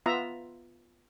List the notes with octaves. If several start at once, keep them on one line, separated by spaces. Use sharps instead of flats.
B3 F4 E5 A#5